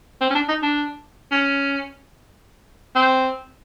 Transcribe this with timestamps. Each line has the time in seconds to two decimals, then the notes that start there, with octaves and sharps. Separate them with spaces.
0.21 C4
0.30 C#4
0.35 D4
0.48 D#4
0.62 D4
1.31 C#4
2.95 C4